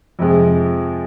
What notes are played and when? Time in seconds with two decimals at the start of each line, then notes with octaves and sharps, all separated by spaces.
0.19 F2 C3 F3 G#3